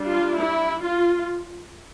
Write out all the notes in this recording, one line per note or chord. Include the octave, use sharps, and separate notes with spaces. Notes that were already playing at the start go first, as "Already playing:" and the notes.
Already playing: G3 D4
F4
E4
F4